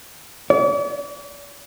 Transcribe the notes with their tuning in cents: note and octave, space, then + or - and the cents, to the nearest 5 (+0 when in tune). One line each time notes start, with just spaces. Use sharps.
D5 -45